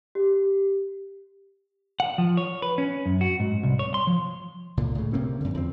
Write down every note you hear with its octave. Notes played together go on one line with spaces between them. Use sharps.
G4
F#5
F3
C#5
B4
C#4
F#2
F#4
G#2
C2
C#5
C6
F3
C#2 A#2 D3
A2 C#3
C3 A#3 C4 C#4
F#2 D3
E2 F3 C4